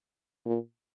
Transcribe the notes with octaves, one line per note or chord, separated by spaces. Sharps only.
A#2